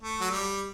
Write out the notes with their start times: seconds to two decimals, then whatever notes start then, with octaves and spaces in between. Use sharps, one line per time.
0.01 A3
0.21 F#3
0.30 G3